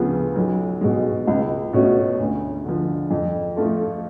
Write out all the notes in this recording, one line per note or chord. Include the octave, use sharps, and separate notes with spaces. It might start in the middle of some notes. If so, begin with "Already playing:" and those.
Already playing: D2 C#3 F3 B3
B1
B2 G#3
C#2
B2 A3 C#4 F#4
D2
D3 F3
F2
F3 A3 F4 A4